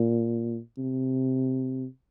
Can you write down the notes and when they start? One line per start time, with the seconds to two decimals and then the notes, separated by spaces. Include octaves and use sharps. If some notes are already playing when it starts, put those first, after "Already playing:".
Already playing: A#2
0.78 C3